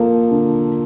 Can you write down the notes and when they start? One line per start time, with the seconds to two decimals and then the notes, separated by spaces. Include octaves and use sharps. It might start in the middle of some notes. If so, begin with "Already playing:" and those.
Already playing: F3 A#3 A4
0.31 D3